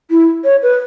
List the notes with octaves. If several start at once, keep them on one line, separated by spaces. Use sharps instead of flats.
E4
C#5
B4